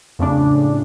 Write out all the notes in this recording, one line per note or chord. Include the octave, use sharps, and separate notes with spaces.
F2 A2 C#3 D4